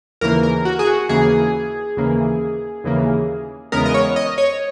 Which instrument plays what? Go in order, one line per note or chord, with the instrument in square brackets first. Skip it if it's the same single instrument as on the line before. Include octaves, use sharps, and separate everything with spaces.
[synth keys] D#2 C#3 E3 A#3 A#4
A#4
F#4
G#4
F#4
D#2 C#3 E3 A#3 G#4
D#2 C#3 E3 A#3
D#2 C#3 E3 A#3
E2 C#3 G#3 B3 A#4
D#5
C#5
D#5
C#5